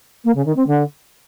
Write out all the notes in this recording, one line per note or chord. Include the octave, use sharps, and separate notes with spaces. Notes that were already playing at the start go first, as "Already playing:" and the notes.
A#3
C#3
D#3
C4
D3